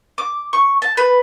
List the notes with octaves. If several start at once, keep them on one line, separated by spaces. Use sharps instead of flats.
D6
C#6
A5
B4